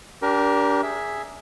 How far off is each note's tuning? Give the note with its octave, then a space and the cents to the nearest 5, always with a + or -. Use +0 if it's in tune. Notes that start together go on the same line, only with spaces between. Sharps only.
D4 -30 G4 -15 A#4 +20
G#4 +0 E5 +0